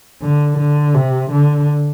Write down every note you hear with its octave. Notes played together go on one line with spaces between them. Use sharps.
D3
D3
C3
D3